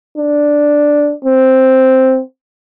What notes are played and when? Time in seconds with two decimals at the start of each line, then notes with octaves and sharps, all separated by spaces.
0.17 D4
1.25 C4